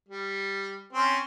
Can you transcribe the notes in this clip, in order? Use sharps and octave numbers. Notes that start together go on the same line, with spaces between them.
G3
C4 C#4